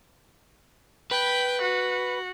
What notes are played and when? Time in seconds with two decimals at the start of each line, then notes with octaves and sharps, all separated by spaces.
1.11 B4 G5
1.62 F#4